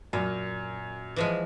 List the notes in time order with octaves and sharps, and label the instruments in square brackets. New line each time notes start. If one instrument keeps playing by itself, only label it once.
[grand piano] F#2 [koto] A#2
[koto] E3 F3 G#3